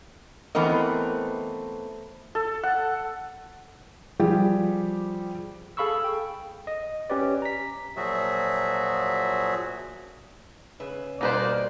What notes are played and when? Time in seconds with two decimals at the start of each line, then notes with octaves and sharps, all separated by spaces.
0.55 E3 A3 B3 C4 A#4 D#5
2.35 A4
2.63 F#5
4.19 F3 G3 G4 G#4
5.77 G#4 A4 F5 B5 C#6 E6
6.04 G5
6.67 D#5
7.10 C#4 G4 B4 D5
7.42 A#5 B6
7.97 A#2 F3 F#3 F#4 G#4 E5
10.80 C#3 B4 E5
11.21 B2 G3 A#3 D#4 B4 C5 D5